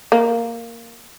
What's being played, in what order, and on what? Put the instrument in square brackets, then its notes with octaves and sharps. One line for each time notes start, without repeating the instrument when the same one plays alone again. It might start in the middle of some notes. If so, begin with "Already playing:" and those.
[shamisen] A#3